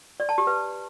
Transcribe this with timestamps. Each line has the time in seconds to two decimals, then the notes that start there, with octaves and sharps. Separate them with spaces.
0.20 D5
0.29 A5
0.38 G4
0.47 B4